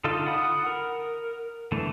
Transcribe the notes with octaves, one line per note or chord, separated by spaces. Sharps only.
D3 D#4 F4 A4
F#5 B5 D#6
A#4
D3 E3 A3